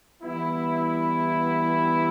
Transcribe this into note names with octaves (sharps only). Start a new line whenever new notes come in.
E3 G3 B3 E4